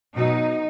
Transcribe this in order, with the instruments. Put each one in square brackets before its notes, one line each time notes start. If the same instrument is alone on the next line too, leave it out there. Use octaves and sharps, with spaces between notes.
[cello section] B2 F#3 D#4